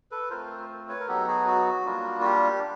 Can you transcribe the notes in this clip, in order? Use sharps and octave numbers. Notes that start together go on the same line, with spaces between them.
A4 B4
A3 C4 F4 A#4 C5
B4 C#5
A#4
F#3 B3 D#4 G4 A4
F#4 G#4
F#4
G3 A#3 D4 F4
F#4
G4